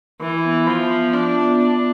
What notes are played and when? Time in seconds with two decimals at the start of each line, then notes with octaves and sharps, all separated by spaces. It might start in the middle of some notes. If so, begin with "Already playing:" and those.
0.21 E3 E5
0.45 B3
0.67 F3 E5
0.91 B3
1.13 D4 F4
1.36 B3
1.58 B3 D4